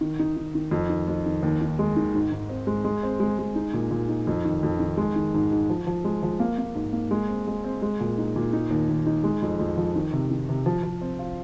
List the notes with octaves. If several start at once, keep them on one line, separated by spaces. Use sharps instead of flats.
D#3
D#4
D#3
D#3
F2
D#3
F2
D#3
D#2
D#3
G#3
D#3
G#2
G#2
C4
G#3
G#3
C4
G#3
G#3
D#4
A#2
A#2
D#4
F2
D#3
F2
D#3
G#3
D#3
G#2
G#2
F3
F3
G#3
F3
A#3
A#3
G#2
A#3
G#3
C4
G#3
C4
G#3
A#2
D#4
A#2
D#4
D#2
D#2
D#4
G#3
F2
F2
F3
D#3
C3
D#3
C3
F3
F3
C4
F4